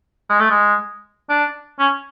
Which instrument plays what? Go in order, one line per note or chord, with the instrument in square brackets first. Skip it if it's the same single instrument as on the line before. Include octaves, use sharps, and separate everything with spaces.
[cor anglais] G#3
A3
G#3
D4
C#4